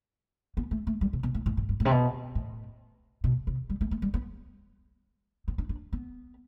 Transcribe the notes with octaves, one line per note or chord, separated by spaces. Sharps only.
B3
A3
A3
G3
C3
B2
A2
A2
A2
G2
A2
C3
B2
A2
B2
C3
G3
A3
A3
G3
B3
C4
D4
D4
B3